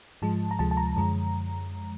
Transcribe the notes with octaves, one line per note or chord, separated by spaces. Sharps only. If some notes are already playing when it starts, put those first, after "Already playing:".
G#2 F3 G#3 A5
A#5
D2 C3 F3 G#3 A5
A5
A#5
F#2 D3 F3 G#3